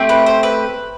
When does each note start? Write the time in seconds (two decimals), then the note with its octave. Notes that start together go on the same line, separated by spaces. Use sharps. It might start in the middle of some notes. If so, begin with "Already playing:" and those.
Already playing: A3 C4 G4
0.09 B4
0.26 C5
0.43 B4